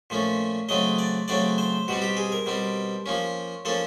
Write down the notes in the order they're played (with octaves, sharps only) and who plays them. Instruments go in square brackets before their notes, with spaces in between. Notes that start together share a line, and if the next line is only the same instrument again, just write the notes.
[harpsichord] A#2 F3 A3 C#4
C#3 F#3 A3 C4 D#5
D5
C#3 F#3 A3 C4 D5
C5
B2 G3 C4 F#4
G4
G#4
A#4
B2 G3 C4
F3 A#3 C#4
F3 A#3 C#4 A4